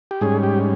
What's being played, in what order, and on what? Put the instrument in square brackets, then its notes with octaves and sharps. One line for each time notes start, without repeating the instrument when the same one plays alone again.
[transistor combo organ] G4
G#2 G3 C#4 G#4
G4